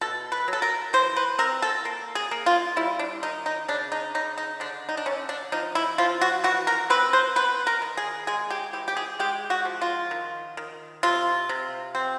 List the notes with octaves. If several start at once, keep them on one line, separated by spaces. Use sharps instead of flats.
B2 A4
B4
F#3
A4
A#4
E3 C5
B4
C4 A#4
A4
A#3
G#4
A#3
F4
G3 E4
D4
D#3 D#4
D#4
C#3 D4
D#4
C#3 D#4
D#4
D3 D4
D#4
D4
D3 C#4
D4
F3 D#4
E4
F3 F4
F#4
E3 F#4
A#4
C4 B4
C5
B3 B4
A#4
D#3
G#4
G#3 G#4
G4
E3 G4
G4
G#4
G#3 G4
F#4
F3
F4
D#3
D#3
C3 F4
C3
C4